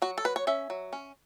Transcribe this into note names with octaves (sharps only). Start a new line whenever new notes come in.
F#3 F#4
A4
F#3 B4
C#5
C#4 E5
F#3
C#4